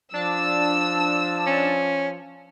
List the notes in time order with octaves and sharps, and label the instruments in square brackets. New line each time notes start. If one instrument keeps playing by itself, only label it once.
[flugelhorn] F3 [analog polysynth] D4 A5 [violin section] E6
[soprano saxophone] C#4